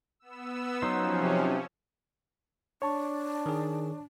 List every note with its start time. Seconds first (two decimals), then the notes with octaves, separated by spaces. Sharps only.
0.20 B3 E6
0.82 F3 F#3 C#4 D#4 C5
1.21 C3
2.82 D4 C#5 A5 C#6
3.46 D#3 G#4